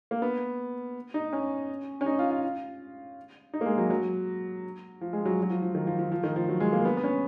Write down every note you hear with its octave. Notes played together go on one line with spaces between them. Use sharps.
A#3
B3
D#4
C#4
C#4
D#4
F4
F4
F4
D#4
A#3
G#3
F#3
F#3
F3
G#3
F#3
F#3
F3
F3
D#3
F3
F3
F3
D#3
F3
F#3
G#3
A#3
B3
B3
C#4